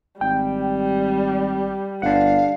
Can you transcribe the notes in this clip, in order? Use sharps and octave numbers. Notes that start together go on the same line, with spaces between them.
G#1 G3 G5
G1 D4 F5 F#5